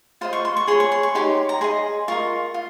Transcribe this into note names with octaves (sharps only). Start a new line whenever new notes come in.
F4 C5 D#5 C6
C#6
C6
C#6
G#4 C#5 C6
C#6
C6
C#6
D#4 G4 C#5 C6
A#5
G#4 D#5 C6
F4 A#4 D#5 C#6
F4